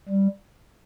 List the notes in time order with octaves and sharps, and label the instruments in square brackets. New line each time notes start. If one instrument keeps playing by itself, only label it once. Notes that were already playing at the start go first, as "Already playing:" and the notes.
[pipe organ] G3